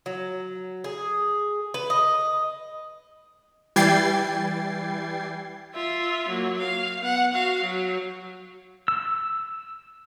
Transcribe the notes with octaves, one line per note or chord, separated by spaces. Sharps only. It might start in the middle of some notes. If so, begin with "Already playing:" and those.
F#3
G#4
B4
D#5
E3 G3 G5 G#6 A6 C7
F4 E5
F#3 A#3
F5
B3 F#5
F#4 F5
F#3
E6